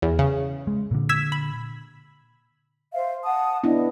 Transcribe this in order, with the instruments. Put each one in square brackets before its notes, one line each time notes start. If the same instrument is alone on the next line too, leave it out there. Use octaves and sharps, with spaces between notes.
[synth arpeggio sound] E2
C#3
[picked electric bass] G#3
A#2 D3
[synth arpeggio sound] E6 G#6 B6
B5
[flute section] C5 E5 F5
F#5 A5 D#6
[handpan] B3 D4 E4 [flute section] D#5